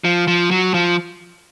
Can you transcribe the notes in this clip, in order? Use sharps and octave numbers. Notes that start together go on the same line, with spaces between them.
F3
F3
F#3
F3